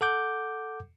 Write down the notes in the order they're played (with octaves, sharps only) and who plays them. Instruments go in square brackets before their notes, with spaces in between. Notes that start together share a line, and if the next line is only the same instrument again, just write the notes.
[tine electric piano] A4 F#5 D6 G6